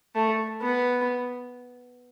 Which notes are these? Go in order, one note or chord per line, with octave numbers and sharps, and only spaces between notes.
A3
B3